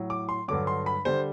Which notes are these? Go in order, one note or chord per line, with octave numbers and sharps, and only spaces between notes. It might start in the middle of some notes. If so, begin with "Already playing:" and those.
Already playing: A2 F#3
D6
C6
G2 D3 F#3 D6
C6
B5
D3 G3 C5